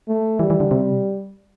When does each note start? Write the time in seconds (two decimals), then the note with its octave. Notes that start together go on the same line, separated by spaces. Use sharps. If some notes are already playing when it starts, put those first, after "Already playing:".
0.08 A3
0.39 E3 G3
0.50 E3
0.60 D3
0.71 C3